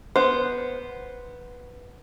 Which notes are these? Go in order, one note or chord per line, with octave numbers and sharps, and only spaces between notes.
B3 C5